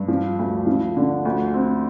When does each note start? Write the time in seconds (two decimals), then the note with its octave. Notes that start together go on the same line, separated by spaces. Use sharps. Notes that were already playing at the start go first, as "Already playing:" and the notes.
Already playing: G2
0.08 F3
0.39 D2
0.67 F3
0.97 D3
1.25 D2
1.54 C4